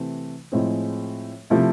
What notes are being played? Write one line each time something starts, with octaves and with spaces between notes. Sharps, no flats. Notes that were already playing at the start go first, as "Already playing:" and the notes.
Already playing: C3 E3 A3 C4
A2 F3 G#3 C4 G#4
C3 F3 A3 E4